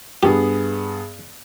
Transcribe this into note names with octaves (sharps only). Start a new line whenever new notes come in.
G2 B3 G4 G#4